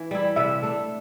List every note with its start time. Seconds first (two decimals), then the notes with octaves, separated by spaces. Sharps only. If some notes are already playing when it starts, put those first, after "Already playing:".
Already playing: E3
0.11 G3 E4
0.36 C3 E5
0.62 A3 D4 A4